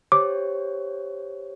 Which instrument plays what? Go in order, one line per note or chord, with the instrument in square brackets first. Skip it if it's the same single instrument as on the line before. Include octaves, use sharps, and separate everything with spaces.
[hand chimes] G4 C5 C#5 [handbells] D6